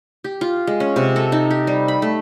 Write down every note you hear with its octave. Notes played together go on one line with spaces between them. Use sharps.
G4
F4
G#3
C#4
C3
A4
D#4
G4
G3
B5
A3